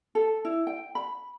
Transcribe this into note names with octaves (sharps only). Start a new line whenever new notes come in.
A4
E4
G5
B5